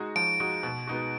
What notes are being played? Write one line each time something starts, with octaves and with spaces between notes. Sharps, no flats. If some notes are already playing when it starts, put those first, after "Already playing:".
Already playing: G#3 D#4 F#4
F3 D7
G#3 D#4 F#4
B2
G#3 B3 D#4 F#4